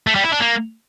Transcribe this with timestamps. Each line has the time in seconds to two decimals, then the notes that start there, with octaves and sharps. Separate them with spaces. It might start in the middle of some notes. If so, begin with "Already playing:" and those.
0.07 A3
0.15 G3
0.24 E4
0.32 D4
0.40 A#3